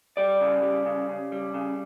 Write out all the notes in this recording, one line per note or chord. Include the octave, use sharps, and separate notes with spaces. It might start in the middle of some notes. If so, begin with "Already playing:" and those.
G3 D5
C#3
G3
C#3
C#3
G3
C#3